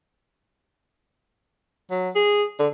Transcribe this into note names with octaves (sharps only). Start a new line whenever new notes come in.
F#3
G#4
D3